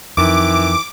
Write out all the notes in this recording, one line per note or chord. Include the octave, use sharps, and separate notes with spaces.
F2 D#3 E3 D6